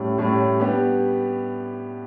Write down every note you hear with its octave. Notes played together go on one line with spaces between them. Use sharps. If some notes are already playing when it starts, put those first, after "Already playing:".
Already playing: A2 G3 C#4
A2 G3 C#4
G3 B3 D4 G4